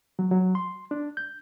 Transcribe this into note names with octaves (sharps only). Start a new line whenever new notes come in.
F#3
F#3
C6
D4
G6